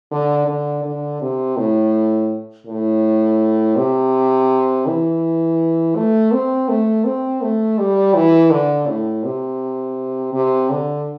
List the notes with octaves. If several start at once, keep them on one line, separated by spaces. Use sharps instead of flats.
D3
D3
D3
C3
A2
A2
C3
E3
A3
C4
A3
C4
A3
G3
E3
D3
A2
C3
C3
D3